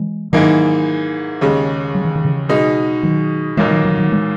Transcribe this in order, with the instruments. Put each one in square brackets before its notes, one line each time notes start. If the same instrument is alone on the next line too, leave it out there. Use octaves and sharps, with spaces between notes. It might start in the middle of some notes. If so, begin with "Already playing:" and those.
Already playing: [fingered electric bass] E3 G#3
[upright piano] G#2 E3 A#3 D#4 [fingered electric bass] D#3 F#3
[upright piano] D#2 C#3 G#3
[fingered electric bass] F#3
E3
D#3
C#3 E3
[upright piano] B2 G#3 D#4
[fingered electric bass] D#3 F#3
[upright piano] B1 A#2 A#3 D#4 [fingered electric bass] E3 G#3
[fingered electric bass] D#3 F#3
D#3 F#3
D#3 F#3
E3 G#3